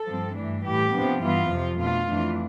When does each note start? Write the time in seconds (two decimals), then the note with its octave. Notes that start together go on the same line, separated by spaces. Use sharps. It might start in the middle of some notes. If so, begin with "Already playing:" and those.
Already playing: A4
0.08 G2 F3 C4
0.37 G2 E3 A3 D4
0.65 A2 E3 G3 G4
0.94 C3 F3 B3 D4
1.23 G2 E3 B3 F4
1.52 F2 C3 F3
1.80 B2 A3 D4 F4
2.09 F2 E3 A3 D4